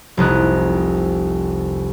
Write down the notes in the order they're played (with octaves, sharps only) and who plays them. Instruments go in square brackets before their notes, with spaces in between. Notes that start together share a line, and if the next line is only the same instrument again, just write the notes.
[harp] F1 C2 D#4 F#6